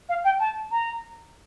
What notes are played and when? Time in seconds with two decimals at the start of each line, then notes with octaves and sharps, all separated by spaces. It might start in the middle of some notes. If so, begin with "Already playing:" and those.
0.09 F5
0.24 G5
0.40 A5
0.71 A#5